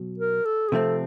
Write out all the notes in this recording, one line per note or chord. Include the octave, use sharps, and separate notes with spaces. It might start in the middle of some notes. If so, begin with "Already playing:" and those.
Already playing: B2 F#3
A#4
A4
G#4
C3 F3 A3 C4 A4